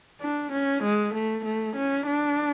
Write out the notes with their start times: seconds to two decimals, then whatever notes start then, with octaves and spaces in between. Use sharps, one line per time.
0.21 D4
0.52 C#4
0.83 G#3
1.14 A3
1.45 A3
1.76 C#4
2.07 D4